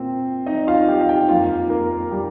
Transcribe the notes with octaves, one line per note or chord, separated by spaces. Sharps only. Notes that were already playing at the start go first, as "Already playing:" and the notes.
Already playing: A#2 A#3 C4 C5
D#4 D#5
F4 F5
G4 G5
F5
G4 G5
F2 F3 A#3 F4 F5
A#3 A#4
G3 G4